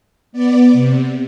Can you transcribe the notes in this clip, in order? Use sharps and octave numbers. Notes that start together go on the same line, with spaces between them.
B3 D5
C3